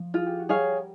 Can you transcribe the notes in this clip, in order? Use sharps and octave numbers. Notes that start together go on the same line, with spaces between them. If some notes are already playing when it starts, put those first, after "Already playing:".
Already playing: F3
F4 G#4
G4
F#4
G3 G4 G#4 C#5 F5
A#4